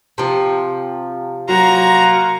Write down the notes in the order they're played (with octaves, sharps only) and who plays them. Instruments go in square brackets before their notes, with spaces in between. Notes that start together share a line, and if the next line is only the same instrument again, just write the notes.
[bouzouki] C3 F3
[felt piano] F#3 [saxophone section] A#3 F4 F#4 [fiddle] A#5